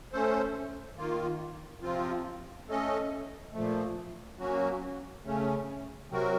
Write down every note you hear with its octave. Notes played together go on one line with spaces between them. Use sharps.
A3 C#4 A4 C5
D#3 A#3 F4
C3 F3 C4 F4
A3 C#4 A4 D#5
A#2 F3 A3
F#3 A#3 C#4 F#4
C#3 A3 C#4
C3 F#3 C4 F#4 A#4